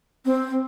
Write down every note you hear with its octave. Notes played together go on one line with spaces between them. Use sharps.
C4